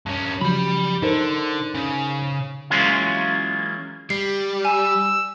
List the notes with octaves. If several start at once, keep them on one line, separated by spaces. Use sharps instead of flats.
G2 C#4
C#3 F3 F#3 G4 B5
D3 D#4 A#4 C5
C#3
E3 F#3 G#3 A#3 C#4 F4
G3 C7
G#5 E6